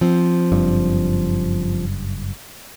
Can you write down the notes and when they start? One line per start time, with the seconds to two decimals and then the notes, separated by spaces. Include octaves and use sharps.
0.01 F3 C4
0.52 F#1 G2